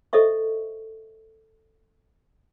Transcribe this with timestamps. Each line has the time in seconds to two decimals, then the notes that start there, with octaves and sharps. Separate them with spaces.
0.13 A4 C5 D#5 E5 C#6